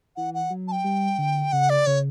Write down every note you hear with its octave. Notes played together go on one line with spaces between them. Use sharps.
E3 F#5
F#5
F#3
A5
G5
G3
D3
C#3 F#5
D5
C#3 C#5